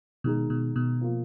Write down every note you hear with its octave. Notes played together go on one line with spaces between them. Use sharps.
B2 D#3 G#3 D#4 G#4
B2
B2
F3 A#3 F4